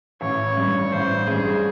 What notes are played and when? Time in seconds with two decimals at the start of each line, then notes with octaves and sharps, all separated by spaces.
0.21 A1 C#5
0.57 G2
0.92 A1 C5
1.27 G2 G#4